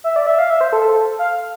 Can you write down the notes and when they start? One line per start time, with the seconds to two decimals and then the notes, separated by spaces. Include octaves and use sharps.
0.04 E5
0.16 D5
0.27 E5
0.38 F5
0.50 E5
0.61 C5
0.73 A4
0.84 A4
1.19 F5